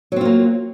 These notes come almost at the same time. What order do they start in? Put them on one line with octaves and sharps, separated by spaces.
F#3 C4 F4 A#3